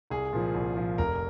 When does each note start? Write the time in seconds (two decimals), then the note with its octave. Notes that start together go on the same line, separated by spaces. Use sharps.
0.10 C2 G#4
0.33 A#2 F3
0.55 C2
0.77 A#2 F3
0.98 F1 A#4